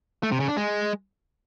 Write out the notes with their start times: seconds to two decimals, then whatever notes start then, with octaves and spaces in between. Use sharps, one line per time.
0.23 A3
0.32 C3
0.40 C#3
0.48 D4
0.57 G#3